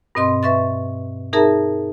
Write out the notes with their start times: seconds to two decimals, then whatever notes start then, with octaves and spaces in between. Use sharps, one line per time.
0.15 G2 B2 C4 D#5 C6
0.43 B4 E5 C#6 A6
1.33 D#4 G#4 A#4 E5 A5 A#5